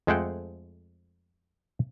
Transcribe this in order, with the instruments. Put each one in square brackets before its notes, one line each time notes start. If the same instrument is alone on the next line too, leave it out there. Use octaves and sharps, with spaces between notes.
[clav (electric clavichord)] F2 G#3 A3 C5 F#5 G5